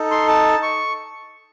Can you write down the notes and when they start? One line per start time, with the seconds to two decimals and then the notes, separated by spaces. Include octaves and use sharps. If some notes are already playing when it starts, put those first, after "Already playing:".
Already playing: D#4 A4
0.11 C6
0.28 A5
0.62 C#6